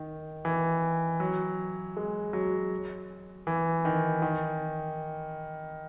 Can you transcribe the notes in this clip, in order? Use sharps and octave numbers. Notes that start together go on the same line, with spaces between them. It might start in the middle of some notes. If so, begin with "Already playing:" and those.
Already playing: D#3
E3
F#3
G#3
F#3
E3
D#3
D#3